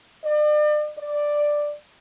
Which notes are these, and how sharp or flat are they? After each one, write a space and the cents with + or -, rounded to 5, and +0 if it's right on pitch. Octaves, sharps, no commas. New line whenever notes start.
D5 +40
D5 +5